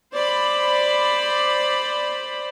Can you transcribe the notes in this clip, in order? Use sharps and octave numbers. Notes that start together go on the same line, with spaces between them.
C5 D5 B5